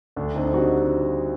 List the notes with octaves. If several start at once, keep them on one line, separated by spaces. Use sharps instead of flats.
D2 D4
D2 C4 D#4
D#4
G3 D4 F#4